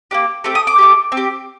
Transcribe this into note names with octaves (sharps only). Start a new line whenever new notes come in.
A#3 D4 G4
A3 C4 G4
D#6
D6
A3 C4 G4
C4
G4